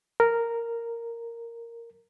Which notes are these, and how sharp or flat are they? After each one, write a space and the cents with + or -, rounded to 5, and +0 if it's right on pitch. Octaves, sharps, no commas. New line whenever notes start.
A#4 -5